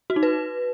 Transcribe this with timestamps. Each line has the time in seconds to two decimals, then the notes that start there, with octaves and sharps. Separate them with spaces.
0.10 F#4
0.16 D#4
0.23 B4